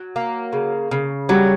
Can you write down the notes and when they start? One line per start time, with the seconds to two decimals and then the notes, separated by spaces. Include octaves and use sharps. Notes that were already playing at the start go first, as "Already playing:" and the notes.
Already playing: F#3
0.16 A#3
0.53 C#3
0.91 C#3
1.29 F#3 G3 G4